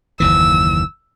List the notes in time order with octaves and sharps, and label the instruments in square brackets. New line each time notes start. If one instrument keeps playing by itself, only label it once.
[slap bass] F#1 D#2 E3 [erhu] E6